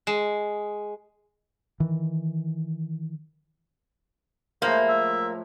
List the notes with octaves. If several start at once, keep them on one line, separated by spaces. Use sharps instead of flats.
G#3
D#3 E3
A2 F3 G#3 A#3 C5
E5